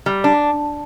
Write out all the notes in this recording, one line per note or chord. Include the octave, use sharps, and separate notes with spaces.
G3
D4